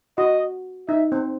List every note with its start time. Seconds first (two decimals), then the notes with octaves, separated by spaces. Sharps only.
0.18 F#4 D#5
0.88 D#4 E5
1.12 C4